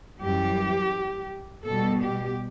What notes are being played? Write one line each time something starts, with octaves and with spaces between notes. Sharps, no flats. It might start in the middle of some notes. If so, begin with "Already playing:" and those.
F#2 E3 G3 G4
B2 G3 A4
G4